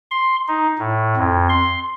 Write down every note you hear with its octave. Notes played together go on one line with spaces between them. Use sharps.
C6
D#4
A2
F2
C6